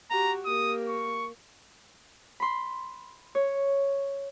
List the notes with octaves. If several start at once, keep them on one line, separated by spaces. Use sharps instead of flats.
F#4 G4 A#5
A#3 G4 D#6
C#6
B5 C6
C#5